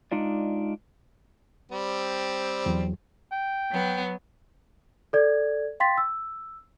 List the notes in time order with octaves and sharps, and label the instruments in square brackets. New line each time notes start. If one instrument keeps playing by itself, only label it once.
[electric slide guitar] G#3 D4 D#4 F4 D5
[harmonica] G3 C4
[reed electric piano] E2 F#3
[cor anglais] G5
[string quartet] F#3 B3
[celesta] A4 D5 G#6
F5 G5 C6 A6 B6
E6